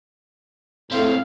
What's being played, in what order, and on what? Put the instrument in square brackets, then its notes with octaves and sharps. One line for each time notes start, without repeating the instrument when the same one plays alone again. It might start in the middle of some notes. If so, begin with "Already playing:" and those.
[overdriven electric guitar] D#2 C4 [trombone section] A2 [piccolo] F5